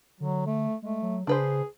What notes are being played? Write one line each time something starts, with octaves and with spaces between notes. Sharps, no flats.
D3 F#3
A3
G#3 A3
F#3
C#3 D4 G#4 B4 C5